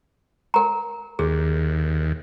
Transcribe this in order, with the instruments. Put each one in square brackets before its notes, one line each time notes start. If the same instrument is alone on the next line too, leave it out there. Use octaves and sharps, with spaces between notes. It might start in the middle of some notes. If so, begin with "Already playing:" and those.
[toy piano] A#4 A#5
[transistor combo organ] D#2 [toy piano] G#4